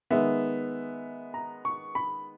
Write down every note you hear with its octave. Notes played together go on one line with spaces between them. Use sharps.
D#3 G#3 B3 E5
A#5
C#6
B5